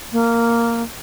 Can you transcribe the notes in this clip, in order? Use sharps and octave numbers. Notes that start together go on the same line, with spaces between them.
A#3